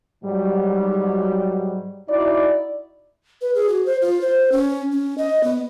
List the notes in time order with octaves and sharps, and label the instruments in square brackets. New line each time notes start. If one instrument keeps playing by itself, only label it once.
[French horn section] G#2 F#3 G3
D#4 E4 F#4 D5
[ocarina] B4
G#4
F#4
C5
F4
C5
C#4
C#4
D#5
B3